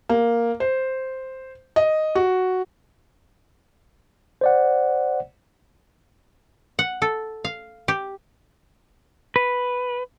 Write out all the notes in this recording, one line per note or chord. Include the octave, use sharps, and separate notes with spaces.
A#3
C5
D#5
F#4
C5 D5 F#5
F#5
A4
F5
G4
B4